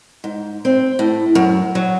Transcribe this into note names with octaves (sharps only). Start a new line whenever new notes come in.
G#2
C4
A2
F#2
F#3